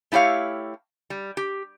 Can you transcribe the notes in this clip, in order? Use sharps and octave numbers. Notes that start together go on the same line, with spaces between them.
A3 E4 G4 C#5 F5
G3
G4